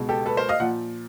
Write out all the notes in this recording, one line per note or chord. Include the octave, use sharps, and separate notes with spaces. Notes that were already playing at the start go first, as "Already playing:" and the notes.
Already playing: C#2 B2 G#3
G4 A4
A4 B4
A#4 C5
D#5 F5
A#2 F3 F#5